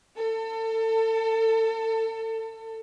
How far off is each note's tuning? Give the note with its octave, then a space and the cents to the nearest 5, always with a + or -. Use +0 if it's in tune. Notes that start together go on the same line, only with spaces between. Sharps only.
A4 +30